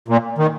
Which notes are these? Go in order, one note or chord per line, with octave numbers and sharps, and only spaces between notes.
A#2
D#3